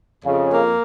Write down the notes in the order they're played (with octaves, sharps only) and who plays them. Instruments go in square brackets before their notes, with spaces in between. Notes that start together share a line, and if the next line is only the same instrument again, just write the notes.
[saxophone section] F2 [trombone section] C#3
[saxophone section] A#3